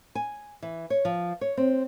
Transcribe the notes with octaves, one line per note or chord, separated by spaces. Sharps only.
G#5
E3
C#5
F3
C#5
C4